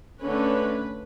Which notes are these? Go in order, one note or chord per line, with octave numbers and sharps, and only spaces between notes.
D3 A3 C#4 B4